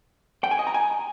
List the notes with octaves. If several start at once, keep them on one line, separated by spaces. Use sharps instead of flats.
G5
G#5
D#5
A#5
G#5